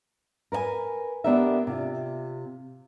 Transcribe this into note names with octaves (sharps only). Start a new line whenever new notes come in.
A#4 B4 D5 G#5
B3 D4 G4 A#4 E5
C3 F4